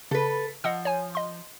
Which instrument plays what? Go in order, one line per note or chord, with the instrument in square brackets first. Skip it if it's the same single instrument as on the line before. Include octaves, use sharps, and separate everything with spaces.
[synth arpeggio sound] C#3 [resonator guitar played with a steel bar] A4 B4
[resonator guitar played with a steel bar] F3 [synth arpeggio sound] D#5 F#5 E6
[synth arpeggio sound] C#5 G#5
D#5 C6